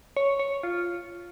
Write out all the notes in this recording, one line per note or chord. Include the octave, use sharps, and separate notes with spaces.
C#5
C#5
F4